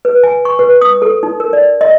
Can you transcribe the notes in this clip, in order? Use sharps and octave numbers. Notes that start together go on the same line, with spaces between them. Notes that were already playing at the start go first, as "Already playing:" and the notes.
B4
G#5
C#6
B4
D#6
A4
D#4
A#4
D5
D#5